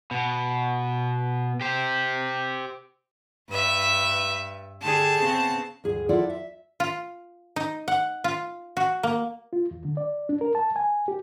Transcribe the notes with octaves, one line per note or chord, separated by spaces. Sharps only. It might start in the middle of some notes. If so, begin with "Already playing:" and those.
B2
G4 C5
G2 B4 E5
D3 G4 G#4 A5
C#3 B3 C4
D2 G2 G#4
E4 F4 A4 D5 F#5
E5
F4
D#4
F#5
F4
F#4
A#3
F4
E2
D3
D5
D4
A#4
A5
G#5
G4